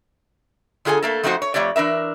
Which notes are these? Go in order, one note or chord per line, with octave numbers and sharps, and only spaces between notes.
D3 F4 G#4 A4 G#5
A3 A#3 A4
F3 A3 C4 D#4 F#4 C5
C#5
F2 A3 G4 C#5 D5
E3 D4 A#4 E5